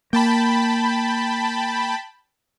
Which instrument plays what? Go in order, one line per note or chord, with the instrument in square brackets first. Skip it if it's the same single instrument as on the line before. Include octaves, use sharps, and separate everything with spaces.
[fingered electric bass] A#3 [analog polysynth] G5 A5 B5